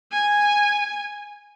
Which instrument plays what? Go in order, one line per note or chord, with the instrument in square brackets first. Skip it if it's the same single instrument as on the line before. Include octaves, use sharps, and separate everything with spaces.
[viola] G#5